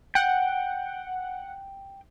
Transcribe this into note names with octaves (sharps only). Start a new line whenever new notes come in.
F#5 G5